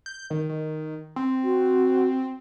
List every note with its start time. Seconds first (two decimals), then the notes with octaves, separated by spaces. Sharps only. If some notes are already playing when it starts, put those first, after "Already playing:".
0.06 G6
0.30 D#3
0.49 D#3
1.16 C4
1.43 F#4